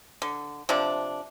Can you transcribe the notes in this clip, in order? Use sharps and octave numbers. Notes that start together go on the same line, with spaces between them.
D3
C3 F3 D4